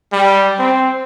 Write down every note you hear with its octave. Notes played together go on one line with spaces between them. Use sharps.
G3
C4